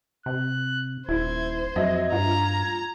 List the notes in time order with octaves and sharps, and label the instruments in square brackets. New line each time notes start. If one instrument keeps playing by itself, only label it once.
[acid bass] C3 [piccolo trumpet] F#6
[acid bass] D#1 [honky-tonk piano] E4 [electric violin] C5 [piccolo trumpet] G#6
[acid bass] F2 [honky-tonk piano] F#3 D#5 E5 [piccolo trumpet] G#6
[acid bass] G2 [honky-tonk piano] F4 [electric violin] A#5